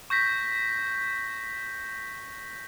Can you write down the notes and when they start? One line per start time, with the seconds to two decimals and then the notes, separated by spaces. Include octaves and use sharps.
0.10 C#6 G6 A#6 B6